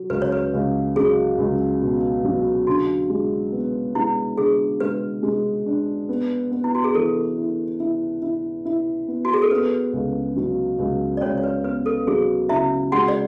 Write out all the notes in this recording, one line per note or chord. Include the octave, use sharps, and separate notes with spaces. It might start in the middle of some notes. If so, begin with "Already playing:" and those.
Already playing: F#3
C#2 B4
C#5
B4
C#2
F#3 G#4
C#2
B2
F#3
D3 F#4
G#3
B3
G#3 E4
D3 G#4
G#3 B4
G#3
D4
B3
B3
E4
F#4
G#4
E3 A4
E4
E4
E4
E4
B3
F#4
G#4
A4
B3 B4
C#2
F#3
C#2
D5
C#2 C#4 C#5
C#5
B4
B3 B4
A4
F#3 G#4
C#3 E4 E5
G#3 F#4 F#5
D5